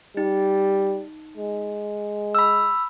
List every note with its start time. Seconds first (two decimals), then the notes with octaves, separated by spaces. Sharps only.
0.17 G3 D#4
1.37 G#3
2.35 B5 E6